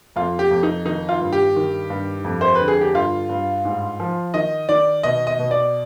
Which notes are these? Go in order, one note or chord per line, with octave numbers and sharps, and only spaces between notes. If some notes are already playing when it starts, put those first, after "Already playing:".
F2 F4
G4
F2
D#4
D#3 D#4
F4
G2
G4
D#3
G2
F2
C5
B4
D3
G#4
G4
G2 F4
G2
G#2
F3
D#3 D#5
D#3 D5
B2 D#5
D#5
B2
D5